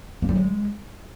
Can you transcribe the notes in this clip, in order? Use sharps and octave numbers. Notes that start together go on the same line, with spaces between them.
A#3
G3
G#3